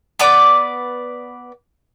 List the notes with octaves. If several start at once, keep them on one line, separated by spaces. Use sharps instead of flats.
B3 B4 D5 D6